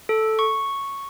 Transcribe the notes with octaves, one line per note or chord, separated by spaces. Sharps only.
A4
C#6